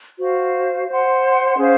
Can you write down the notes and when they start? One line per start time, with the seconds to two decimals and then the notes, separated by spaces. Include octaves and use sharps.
0.18 F#4 C5 F5
0.87 C5 F#5 C6
1.57 C#4 G#4 C5 F5